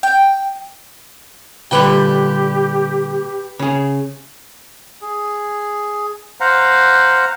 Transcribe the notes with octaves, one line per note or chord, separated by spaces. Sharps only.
G5
A#2 D3 G3 G4 B4 G5
C#3 G#4
G#4
C5 F5 F#5 A#5